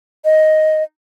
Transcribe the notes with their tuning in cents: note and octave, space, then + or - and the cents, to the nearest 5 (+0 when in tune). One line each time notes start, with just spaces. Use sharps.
D#5 +5